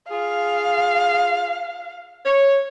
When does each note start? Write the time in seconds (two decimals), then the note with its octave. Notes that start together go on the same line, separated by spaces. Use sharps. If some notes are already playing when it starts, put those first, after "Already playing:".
0.10 F4 G#4 F5
2.25 C#5